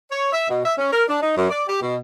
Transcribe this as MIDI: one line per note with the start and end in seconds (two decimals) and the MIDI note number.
0.11 0.31 73
0.32 0.48 76
0.49 0.62 47
0.65 0.73 76
0.77 0.90 61
0.92 1.02 70
1.08 1.19 62
1.21 1.33 63
1.36 1.49 42
1.49 1.64 74
1.68 1.79 67
1.80 1.96 47